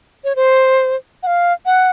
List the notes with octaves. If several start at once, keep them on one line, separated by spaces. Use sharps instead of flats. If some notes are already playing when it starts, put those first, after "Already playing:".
C#5
C5
F#5
F5
F#5